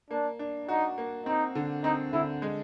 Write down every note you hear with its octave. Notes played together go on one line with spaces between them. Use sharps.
A#3 D4
D4
D#4 F#4
A#3
C4 D#4
D3
C4 D#4
D3 E4
G#3